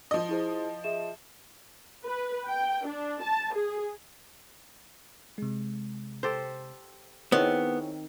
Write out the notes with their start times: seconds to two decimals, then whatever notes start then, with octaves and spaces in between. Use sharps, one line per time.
0.11 F3 D#5
0.29 E4 G#4 C5
0.84 G#4 E5 E7
2.06 B4
2.47 G5
2.86 D4
3.22 A5
3.54 G#4
5.38 C3 G#3
6.23 G4 A4 C5
7.32 D#3 B3 C4 E4 G#4 C#5